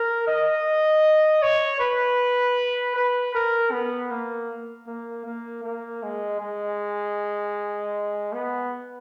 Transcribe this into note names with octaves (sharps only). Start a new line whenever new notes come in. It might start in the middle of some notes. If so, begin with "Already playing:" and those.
Already playing: A#4
D#5
C#5
B4
B4
A#4
B3
A#3
A#3
A#3
A#3
G#3
G#3
B3